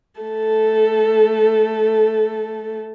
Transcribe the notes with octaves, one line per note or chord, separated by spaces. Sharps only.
A3 A4